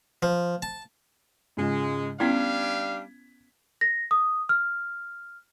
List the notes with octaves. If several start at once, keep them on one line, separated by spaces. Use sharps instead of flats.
F3
A5
G#2 C#3 G#3 F4
G3 B3 C#4 D4 E4 F5 G#6 B6
A#6
D#6
F6